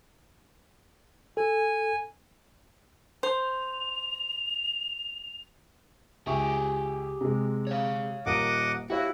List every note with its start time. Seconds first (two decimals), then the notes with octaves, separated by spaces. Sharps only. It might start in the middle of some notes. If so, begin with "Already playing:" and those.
1.37 A4 G#5
3.23 C5 F7
6.26 C#2 G4 G#4 E5 C#6
7.21 C3 G#3
7.67 C#5 F5
8.26 D#1 A#4 D#5 F#5 D6 D7
8.90 E4 F#4 G4 C#5 F5